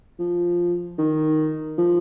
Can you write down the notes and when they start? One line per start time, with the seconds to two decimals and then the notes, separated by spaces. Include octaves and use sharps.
0.19 F3
0.98 D#3
1.78 F3